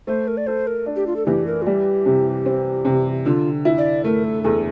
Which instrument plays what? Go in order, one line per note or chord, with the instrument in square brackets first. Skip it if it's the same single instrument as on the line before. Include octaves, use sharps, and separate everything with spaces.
[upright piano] A3 [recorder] C5
[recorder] A#4
D5
[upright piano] A4 [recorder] C5
[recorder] A#4
[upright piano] D4
[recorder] G4
F4
A4
[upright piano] E3 [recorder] G4
[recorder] A#4
F4
[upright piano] G3 [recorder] G4
[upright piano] C3
C4
C3
[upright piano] D3 [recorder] F4
[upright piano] E4
[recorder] D5
[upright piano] A3 [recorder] A#4
[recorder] A4
[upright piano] E2 [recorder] A4